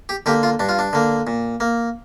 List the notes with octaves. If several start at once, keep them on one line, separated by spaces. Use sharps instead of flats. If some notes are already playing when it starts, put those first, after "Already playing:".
G4
D3 A#3 G4
F4
G2 D4
F4
D4
D3 A#3
A#2
A#3